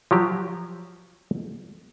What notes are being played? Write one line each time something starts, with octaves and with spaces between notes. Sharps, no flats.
F3 F#3 G4